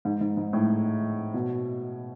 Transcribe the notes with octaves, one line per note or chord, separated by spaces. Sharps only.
G#2
G#2
G#2
A2
B2